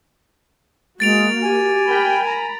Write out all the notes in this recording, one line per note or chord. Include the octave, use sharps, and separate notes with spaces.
G#3 A#3 F#4 A6 D7 F7
G4 G#5
A#4 G5 B5
A#5 B5